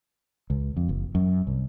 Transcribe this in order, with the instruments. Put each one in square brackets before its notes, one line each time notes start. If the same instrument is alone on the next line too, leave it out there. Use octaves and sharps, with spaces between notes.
[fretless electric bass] C#2
F2
F#1
F#2
C2